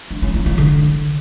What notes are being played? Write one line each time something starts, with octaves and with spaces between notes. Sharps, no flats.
D4
C#4
F4
F4
D3